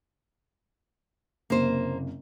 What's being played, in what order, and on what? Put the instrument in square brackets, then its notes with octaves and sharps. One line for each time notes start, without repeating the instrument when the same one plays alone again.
[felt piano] F#1 C3 [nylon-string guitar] A#3 C5